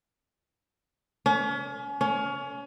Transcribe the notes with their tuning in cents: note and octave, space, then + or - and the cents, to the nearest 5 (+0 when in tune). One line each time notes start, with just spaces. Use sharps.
C#4 +35
C#4 +25